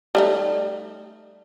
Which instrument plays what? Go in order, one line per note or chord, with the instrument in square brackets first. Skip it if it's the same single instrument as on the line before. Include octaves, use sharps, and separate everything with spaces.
[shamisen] G3 A3 D#4